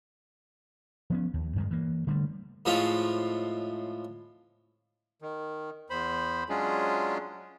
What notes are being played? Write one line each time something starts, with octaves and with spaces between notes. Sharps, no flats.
F3 B3 C#4
D#2
G2 D#3 G#3
E3 A#3
D3 G3 A3
A2 F3 G#3 C4 C#4 F4
D#3
E2 C5 B5
F#3 G#3 C#4 D4 F4 G#4